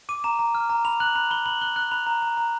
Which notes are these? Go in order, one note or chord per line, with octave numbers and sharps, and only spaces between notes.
D6 D#7
A#5 E7
A#5
F6
A#5
B5 F7
F#6 F#7
B5 F7
B5 G7
B5 F#7
F#6 G7
F#6
B5 F7
A#5
A#5
A#5